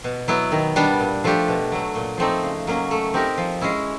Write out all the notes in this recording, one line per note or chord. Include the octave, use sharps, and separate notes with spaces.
B2
F#3 B3 E4
D#3
G3 B3 D4
A#2
F3 A3 D4 G4
B2
F#3 A3
A#2
F3 A3 C4 D#4
C#3
F#3 A#3 C#4
A3
C4 D#4 G4 A#4
F3
G#3 C#4 E4